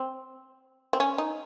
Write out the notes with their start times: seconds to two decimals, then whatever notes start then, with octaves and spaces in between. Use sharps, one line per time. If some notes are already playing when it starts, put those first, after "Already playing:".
Already playing: C4
0.93 C4
1.00 C#4
1.18 D#4